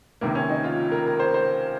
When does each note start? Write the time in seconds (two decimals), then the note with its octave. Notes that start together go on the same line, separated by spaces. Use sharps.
0.21 C#2 C3 D#3 A#3
0.35 C#4
0.49 D#4
0.64 F4
0.92 A#4
1.06 A#4
1.20 C5
1.34 C5